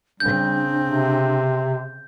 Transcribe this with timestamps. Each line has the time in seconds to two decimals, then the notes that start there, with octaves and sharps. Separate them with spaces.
0.20 C#3 G3 C4 D4 G6
0.87 C3